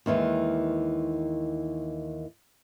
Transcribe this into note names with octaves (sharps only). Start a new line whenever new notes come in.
D#2 D#3 E3 G#3